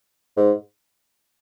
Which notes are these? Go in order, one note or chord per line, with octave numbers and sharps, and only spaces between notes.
G#2